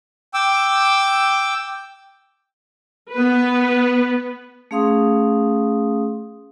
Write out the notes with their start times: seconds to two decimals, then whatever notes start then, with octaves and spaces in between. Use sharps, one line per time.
0.34 G5 D6 E6
3.12 B3 B4
4.71 A3 C#4 G#4 F5 C6 D#6